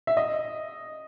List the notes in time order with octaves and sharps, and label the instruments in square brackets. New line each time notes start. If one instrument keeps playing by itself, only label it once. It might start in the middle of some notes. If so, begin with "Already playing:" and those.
[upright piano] E5
D#5